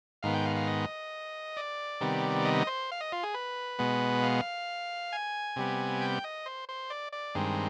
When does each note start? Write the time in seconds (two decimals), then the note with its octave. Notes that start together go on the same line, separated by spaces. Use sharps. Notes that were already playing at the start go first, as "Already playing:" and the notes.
0.23 G#2 D#3 B3 F5
0.34 G5
0.46 F5
0.56 F5
0.67 D#5
1.57 D5
2.01 C3 D#3 G3 B3
2.45 D#5
2.67 C5
2.92 F5
3.01 D#5
3.12 F4
3.23 G#4
3.34 B4
3.79 B2 G#3 B3
4.23 F5
5.13 G#5
5.56 C3 G3 B3
6.01 G5
6.24 D#5
6.46 C5
6.69 C5
6.90 D5
7.13 D5
7.35 G2 D#3 G#3 C4